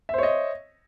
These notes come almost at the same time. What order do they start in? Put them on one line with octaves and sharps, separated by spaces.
E5 C5 C#5 D#5